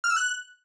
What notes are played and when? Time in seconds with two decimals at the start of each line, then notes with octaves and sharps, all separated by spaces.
0.04 F6
0.10 E6
0.16 F#6